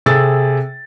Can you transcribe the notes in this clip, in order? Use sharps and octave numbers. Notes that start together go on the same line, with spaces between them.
C3 G#4 A4 E6 A6